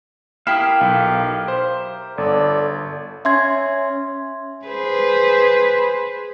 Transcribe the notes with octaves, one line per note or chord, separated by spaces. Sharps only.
E4 G4 A#4 F5 D#6 B6 E7
B1
C5
G1 A4 D5
C#4 E5 C6 G#6
G#4 B4 C5